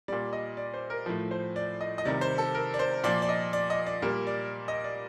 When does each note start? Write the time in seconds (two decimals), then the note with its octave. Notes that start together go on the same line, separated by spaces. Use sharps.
0.08 A#2 G3 D5
0.33 D#5
0.57 D5
0.74 C5
0.90 A#4
1.06 A2 F3
1.31 C5
1.56 D5
1.81 D#5
1.98 D#5
2.05 C3 D#3 G3 D5
2.21 C5
2.38 A4
2.55 A#4
2.74 D5
2.79 C5
3.04 A#2 F3 D5
3.22 D5
3.29 D#5
3.53 D5
3.70 D#5
3.87 D5
4.02 A#2 G3 A#4
4.27 D5
4.68 D#5
4.84 D5